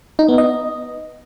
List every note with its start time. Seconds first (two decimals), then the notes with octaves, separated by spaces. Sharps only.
0.19 D#4
0.28 B3
0.38 D#5